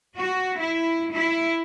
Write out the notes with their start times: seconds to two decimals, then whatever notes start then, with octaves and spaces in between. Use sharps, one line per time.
0.19 F#4
0.61 E4
1.15 E4